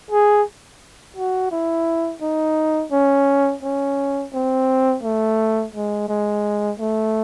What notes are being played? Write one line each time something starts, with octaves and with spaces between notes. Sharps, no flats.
G#4
F#4
E4
D#4
C#4
C#4
C4
A3
G#3
G#3
A3